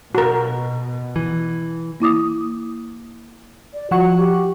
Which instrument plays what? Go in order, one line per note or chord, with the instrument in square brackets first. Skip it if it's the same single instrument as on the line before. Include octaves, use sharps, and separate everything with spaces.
[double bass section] B2 [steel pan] F#4 A#4
[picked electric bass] E3
[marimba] A#3 E4 D6 D#6
[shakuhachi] D5
[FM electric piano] F3 F#5 C#6 [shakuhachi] F#4
[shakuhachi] G4